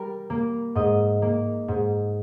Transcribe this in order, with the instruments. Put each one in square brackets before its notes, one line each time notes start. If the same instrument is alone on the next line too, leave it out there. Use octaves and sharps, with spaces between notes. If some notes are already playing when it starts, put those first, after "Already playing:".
Already playing: [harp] G3 A#4
A#3
G#2 D#5
A#3
G#2